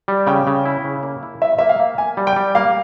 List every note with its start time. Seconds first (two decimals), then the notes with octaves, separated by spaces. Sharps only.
0.08 G3
0.27 C#3 G5
0.47 C#3
0.65 E4
0.84 C#3
1.03 A#3
1.23 E4
1.42 A#3 E5
1.59 A#3 E5
1.69 F5
1.79 A#3
1.98 A#3 G#5
2.17 G3
2.27 G5
2.36 G3
2.55 A#3 F5